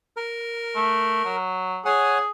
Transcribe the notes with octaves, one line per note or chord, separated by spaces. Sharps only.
A#4
A3
F#3
G#4 C#5 F#5 G#5